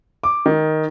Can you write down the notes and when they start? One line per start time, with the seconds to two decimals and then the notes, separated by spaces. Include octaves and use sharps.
0.24 D6
0.46 D#3